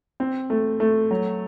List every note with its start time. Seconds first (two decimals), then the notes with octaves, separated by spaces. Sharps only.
0.20 C4
0.50 A3
0.80 A3
1.11 F#3